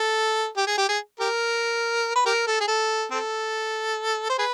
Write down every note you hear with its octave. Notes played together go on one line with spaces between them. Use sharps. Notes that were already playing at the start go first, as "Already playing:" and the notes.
Already playing: A4
G4
G#4
G4
G#4
G4 A#4
B4
G4 A#4
A4
G#4
A4
C4 A4
C5
G#4 B4